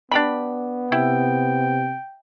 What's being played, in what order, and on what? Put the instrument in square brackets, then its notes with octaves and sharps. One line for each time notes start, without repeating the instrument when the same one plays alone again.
[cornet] B3 [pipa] D4 G4 B5
[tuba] C3 [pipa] E4 [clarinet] G5